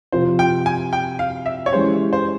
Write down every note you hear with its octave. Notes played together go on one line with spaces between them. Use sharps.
C3 F3 C4 F4 C5
G5
G#5
G5
F5
E5
C#5
E3 G#3 C#4 G4 C5
C5